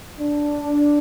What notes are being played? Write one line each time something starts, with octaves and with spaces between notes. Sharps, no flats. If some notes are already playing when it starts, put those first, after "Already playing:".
D4